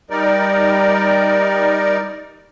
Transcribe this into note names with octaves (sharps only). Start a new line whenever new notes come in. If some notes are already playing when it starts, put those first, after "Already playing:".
G3 D#4 A#4 D5